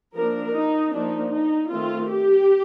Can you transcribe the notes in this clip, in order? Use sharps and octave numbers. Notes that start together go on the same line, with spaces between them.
F3 A#3 D4 A#4
D#4
F3 A#3 D4 D#4
D#4
D#3 A3 C4 F4
G4